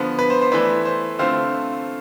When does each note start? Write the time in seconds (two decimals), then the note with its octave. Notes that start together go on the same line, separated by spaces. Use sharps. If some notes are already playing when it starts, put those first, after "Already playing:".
Already playing: D3 F3 B3
0.19 B4
0.30 C5
0.41 C5
0.52 E3 A3 E4 B4 D5
0.85 C5
1.19 D3 A3 C4 F4 C5